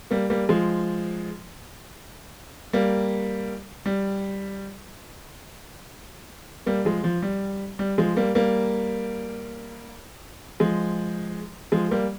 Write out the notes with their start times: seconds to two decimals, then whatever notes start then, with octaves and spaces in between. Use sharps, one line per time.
0.11 G3 A#3
0.30 G3 A#3
0.49 F3 G#3
2.73 G3 A#3
3.86 G3
6.66 G3 A#3
6.85 F3 G#3
7.04 F3
7.22 G3
7.79 G3
7.98 F3 G#3
8.17 G3 A#3
8.35 G3 A#3
10.60 F3 G#3
11.72 F3 G#3
11.91 G3 A#3